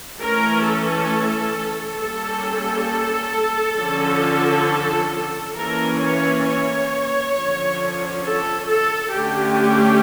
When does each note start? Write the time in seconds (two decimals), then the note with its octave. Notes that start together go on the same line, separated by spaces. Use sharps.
0.20 E3 A3 C#4 A#4
0.65 A4
1.99 G3 A#3 C#4 A4
3.78 D3 F3 C#4
5.56 E3 A#3 C#4 A#4
6.02 C#5
6.46 C#5
7.35 D3 F3 C#4
8.24 A4
8.69 A4
9.13 D3 A3 C#4 G4